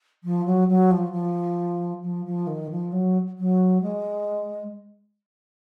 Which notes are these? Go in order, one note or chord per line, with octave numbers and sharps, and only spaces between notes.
F3
F#3
F#3
F3
F3
F3
F3
D#3
F3
F#3
F#3
G#3